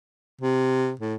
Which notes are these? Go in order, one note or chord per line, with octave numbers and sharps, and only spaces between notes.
C3
A2